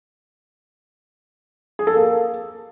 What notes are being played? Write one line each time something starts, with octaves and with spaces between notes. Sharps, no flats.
G#4
A4
A#3